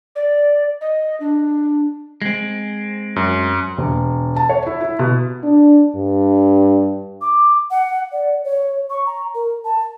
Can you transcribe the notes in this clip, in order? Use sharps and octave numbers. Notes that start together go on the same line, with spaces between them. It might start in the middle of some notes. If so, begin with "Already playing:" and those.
D5
D#5
D4
G#3 C4
F#2
E1
A5
C#5
E4
E4
B2
D4
G2
D6
F#5
D5
C#5
C#6
A#5
A#4
A5